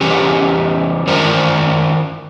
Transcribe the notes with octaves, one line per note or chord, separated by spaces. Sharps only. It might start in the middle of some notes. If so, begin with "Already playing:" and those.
E3 G3 C#4 G4
D#3 C#4 F4 A#4 C5 D5